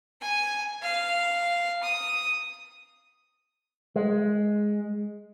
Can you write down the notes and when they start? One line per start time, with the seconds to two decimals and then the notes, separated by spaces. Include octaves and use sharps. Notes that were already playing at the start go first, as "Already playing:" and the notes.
0.21 G#5
0.83 F5
1.83 D#6
3.96 G#3